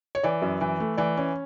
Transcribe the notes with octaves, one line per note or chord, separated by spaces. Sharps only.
C#5
E3 D5
F#2
E3
A3
E3 D5
C#4